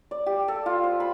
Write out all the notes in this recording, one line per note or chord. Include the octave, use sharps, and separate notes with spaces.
D5
G4
A4
F4
C5
B5